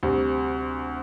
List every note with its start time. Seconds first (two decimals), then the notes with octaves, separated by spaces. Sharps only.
0.03 D2 C3 G3